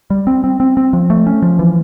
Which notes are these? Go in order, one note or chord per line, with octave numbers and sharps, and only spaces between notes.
G3
C4
C4
C4
C4
F3
A3
C#4
F3
E3